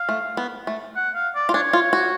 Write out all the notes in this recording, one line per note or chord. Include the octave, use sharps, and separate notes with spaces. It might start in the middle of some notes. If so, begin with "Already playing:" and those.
Already playing: F5
A3
B3
A3
F#5
F5
D5
F4
D4 C#5
F4
F#4